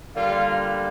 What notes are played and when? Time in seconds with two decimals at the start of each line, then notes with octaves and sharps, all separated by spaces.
0.15 D3 G3 A#3 F4